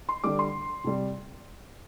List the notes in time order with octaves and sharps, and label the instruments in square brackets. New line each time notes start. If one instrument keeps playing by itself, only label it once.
[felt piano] C6
D3 G3 D6
C6
C3 G3